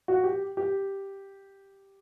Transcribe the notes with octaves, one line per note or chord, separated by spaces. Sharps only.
F#4
G4
G4